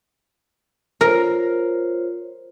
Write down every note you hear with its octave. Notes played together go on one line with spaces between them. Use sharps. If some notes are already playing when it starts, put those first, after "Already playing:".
F4 A#4 C5 C#5